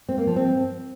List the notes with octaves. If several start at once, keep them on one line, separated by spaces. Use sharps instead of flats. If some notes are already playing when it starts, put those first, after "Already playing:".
C4
A#3
F3
C4